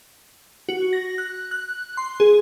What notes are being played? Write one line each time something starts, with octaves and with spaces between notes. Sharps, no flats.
F#4
A#6
F#6
F#6
C6
G#4